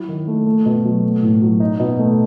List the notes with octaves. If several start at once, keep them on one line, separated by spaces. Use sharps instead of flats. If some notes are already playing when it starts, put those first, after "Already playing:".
Already playing: F#3 E4
D#3
A3
A3
B2
F#3
A3
A2
F#3
D#4
B2
A3